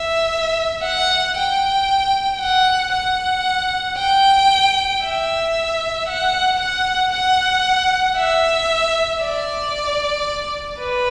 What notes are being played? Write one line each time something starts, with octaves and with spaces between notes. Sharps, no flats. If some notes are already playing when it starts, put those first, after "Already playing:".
Already playing: E5
F#5
G5
F#5
F#5
G5
E5
F#5
F#5
F#5
E5
D5
B4